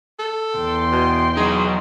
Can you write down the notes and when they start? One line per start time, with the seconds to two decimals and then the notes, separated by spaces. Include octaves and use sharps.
0.19 A4
0.58 E2 G5 C6
0.92 B2
1.37 F#3 D#4 G#4